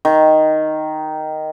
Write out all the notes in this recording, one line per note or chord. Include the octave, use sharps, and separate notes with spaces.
D#3